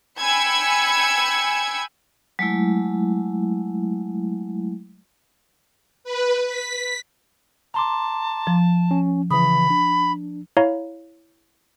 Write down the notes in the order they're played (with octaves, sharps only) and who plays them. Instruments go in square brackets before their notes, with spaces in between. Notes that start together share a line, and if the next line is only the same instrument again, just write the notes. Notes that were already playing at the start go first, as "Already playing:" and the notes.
[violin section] G5 G#5 B5 E6 G#6 C#7
[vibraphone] F#3 G#3 A3 E4
[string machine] B4
B6
[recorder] A5 [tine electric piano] A#5 C6 D6
[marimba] F3
[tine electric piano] C#4
[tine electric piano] C#3 E3 [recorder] B5 [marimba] D#6
[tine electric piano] D4
[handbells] E4 C#5 F5 A#5